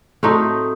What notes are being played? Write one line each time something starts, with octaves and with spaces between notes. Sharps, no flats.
A2 F#3 A3 C4 D#4